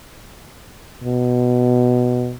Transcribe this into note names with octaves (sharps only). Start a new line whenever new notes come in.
B2